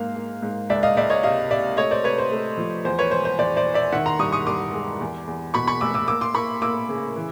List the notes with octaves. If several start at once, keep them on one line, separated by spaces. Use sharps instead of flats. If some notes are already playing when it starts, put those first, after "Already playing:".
Already playing: G#2 A#3 F5
A#3
G#2
C#2 D5 E5
D#5 F5
C#2 D5 E5
C#5 D#5
C3 D#5 F5
C3 D5 E5
A3 C#5 D#5
C5 D5
C3 B4 C#5
C5
A3
F3
E2 C5
B4 C#5
E1 C5
C5
E2 C5 D5
C5 D5
E1
D5 E5
D#3 E5 F#5
A#5 C6
G2 C#6 D#6
C#6 D#6
G2 C6 D6
G#3
E2
E2
B2 B5 C#6
B5 C#6
F1 D6 E6
D6 E6
A#3 D6 E6
C6 D6
A#3 B5 C#6
A#3 D6 E6
C#3
E3